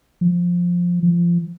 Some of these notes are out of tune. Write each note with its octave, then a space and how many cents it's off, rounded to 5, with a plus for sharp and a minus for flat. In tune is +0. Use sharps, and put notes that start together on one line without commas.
F3 +10
F3 -20